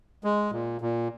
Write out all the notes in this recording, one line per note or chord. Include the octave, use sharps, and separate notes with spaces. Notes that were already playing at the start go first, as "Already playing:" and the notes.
G#3
A#2
A#2